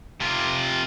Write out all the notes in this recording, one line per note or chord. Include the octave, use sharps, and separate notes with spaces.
C3 F4